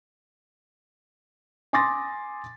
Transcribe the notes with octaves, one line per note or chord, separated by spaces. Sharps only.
G#5 C6 D6 D#6 A6 A#6